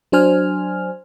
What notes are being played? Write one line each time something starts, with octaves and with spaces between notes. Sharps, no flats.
F#3 D4 C5 G#5 F6